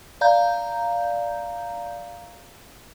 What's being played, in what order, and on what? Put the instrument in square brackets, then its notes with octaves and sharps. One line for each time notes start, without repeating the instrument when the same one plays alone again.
[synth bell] D5 F5 A#5 G6